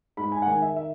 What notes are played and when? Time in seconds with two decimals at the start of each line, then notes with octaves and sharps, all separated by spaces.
0.17 G#2 B5
0.32 G#5
0.42 F#5
0.47 D#3 G#5
0.62 E5
0.76 E5